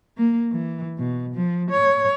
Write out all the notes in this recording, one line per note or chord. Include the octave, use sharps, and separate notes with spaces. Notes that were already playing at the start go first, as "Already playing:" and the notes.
A#3
E3
B2
F3
C#5